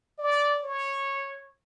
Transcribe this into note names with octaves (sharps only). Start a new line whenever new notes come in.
D5
C#5